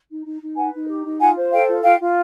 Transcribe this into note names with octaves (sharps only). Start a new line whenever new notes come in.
D#4
D#4
D#4
B4 F#5 G#5
D#4
G4
D#4
F4 F#5 G#5
C5
A4 F5 G5
F4
F4 F5 G5
F4